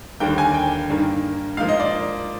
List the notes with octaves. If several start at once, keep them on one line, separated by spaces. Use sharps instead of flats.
D#2 D3 G3 A#3 G5
G#5
G5
G2 D#3 A#3
G#2 F3 A#3 F5
D#5
D5